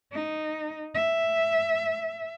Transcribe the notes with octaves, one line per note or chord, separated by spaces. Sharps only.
D#4
E5